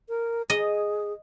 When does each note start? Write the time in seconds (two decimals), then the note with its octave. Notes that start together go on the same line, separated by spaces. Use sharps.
0.09 A#4
0.50 G#4 D#5